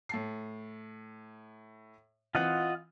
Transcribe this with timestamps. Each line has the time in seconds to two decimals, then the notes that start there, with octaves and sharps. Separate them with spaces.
0.09 A2 A5 C7
2.35 E3 C4 F4 D#5 F#5